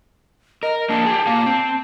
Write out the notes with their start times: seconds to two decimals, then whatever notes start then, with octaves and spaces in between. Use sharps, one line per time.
0.63 A#4 D#5
0.89 A#3 D4 A5
1.06 G4 G#4
1.27 A#2 A#3 F5
1.46 C4